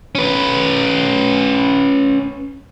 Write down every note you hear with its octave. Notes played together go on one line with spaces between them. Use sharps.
C#4 B4